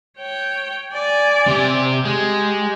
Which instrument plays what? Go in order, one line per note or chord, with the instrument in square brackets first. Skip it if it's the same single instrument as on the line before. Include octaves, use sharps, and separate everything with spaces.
[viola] C#5 G5
D5 G#5
[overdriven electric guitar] C3 G4
[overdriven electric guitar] G#3 [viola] G4